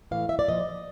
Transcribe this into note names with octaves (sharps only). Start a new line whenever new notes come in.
A2 E3 F5
E5
D5
A#2 F3 D#5